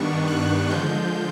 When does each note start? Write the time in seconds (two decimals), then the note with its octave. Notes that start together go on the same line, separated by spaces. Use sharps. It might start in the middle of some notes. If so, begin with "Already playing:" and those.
Already playing: G2 D#3 G3 B3 D4 C#6
0.27 F#6
0.70 D3 F3 G#3 G6